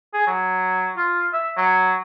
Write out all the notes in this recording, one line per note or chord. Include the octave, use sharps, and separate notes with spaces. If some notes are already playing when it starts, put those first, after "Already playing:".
G#4
F#3
F4
E5
F#3